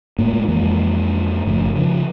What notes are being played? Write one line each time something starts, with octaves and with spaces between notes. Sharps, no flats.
A2 G#3 A#3
F2 E3 G#3 A#3
F#1 A2 C3 F3
C#3 E3 F3